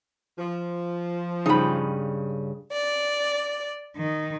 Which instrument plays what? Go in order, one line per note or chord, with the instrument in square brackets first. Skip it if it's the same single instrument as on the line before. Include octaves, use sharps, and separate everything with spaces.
[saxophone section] F3
[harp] G2 C#3 [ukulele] D#4 B5
[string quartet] D5
D#3